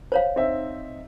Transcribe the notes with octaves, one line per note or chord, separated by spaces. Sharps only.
C5 C#5 F5
C4 D#4 E5